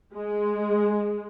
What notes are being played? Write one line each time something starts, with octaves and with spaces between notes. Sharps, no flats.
G#3